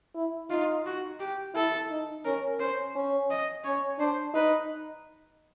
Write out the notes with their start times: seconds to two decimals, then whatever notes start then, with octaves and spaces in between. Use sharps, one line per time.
0.15 E4
0.50 D#4 F4
0.86 F#4
1.20 G4
1.55 E4 A4
1.90 D#4
2.24 C#4 A#4
2.59 C#4 C5
2.95 C#4
3.30 D#5
3.64 C#4 C#5
3.99 D4 C5
4.34 D#4 B4